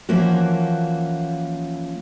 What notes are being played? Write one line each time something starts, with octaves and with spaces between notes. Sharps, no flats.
E3 F3 A#3 C#4 F#4